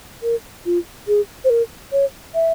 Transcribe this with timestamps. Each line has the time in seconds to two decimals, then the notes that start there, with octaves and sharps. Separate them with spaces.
0.23 A#4
0.66 F4
1.08 G#4
1.44 C5
1.50 A#4
1.92 C#5
2.34 E5